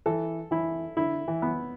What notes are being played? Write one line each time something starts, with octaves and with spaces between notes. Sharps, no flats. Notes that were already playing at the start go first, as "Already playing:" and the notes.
E3 A4
E3 E4
D3 E4
E3
B3